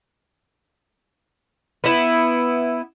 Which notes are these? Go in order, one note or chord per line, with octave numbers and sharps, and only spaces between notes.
B3 E4